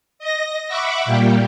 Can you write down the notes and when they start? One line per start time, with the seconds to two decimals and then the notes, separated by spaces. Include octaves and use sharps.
0.19 D#5 A#6
0.68 E5 F#5 B5 C#6 D6
1.05 A#2 G3 A#3 G4